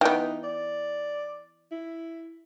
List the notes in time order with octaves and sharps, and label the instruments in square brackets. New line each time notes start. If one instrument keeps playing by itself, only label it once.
[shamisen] E3 B3 [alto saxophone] D#4 [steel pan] G5
[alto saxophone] D5
E4